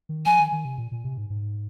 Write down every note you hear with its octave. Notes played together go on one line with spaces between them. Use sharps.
D#3
F3 G#5
D#3
D#3
C3
A#2
A#2
C3
G#2
G#2